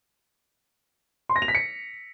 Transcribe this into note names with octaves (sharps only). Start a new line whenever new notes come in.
C6
A#6
F7
B6
C#7